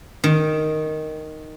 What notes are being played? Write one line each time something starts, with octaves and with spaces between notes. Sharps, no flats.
D#3